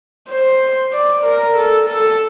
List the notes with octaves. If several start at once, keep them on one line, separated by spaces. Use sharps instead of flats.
C5
D5
A#4
A4
A4